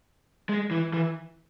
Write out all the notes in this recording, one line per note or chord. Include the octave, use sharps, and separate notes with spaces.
G#3
E3
E3